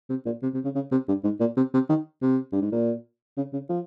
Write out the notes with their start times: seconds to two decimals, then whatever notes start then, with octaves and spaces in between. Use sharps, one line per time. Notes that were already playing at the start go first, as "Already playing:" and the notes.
0.10 C3
0.26 A#2
0.43 C3
0.54 C3
0.64 C#3
0.75 C#3
0.92 C3
1.08 G2
1.24 G#2
1.40 A#2
1.57 C3
1.74 C3
1.90 D#3
2.22 C3
2.52 G2
2.61 G#2
2.72 A#2
3.37 C#3
3.53 C#3
3.69 F3